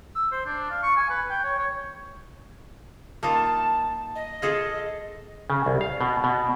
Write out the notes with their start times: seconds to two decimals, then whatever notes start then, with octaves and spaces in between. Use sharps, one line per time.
0.16 E6
0.32 C5
0.46 D4
0.71 F5
0.83 C#6
0.97 G#5
1.10 B4
1.30 G5
1.44 C#5
1.59 C#5
3.23 A#3 D#4 F4 A5
4.15 D#5
4.42 F4 G#4 A4
5.50 C#3
5.66 C2
5.81 F5
6.01 B2
6.24 B2